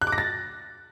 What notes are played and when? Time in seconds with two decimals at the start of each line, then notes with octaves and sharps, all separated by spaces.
0.02 F#6
0.07 D6
0.12 A#6
0.18 A6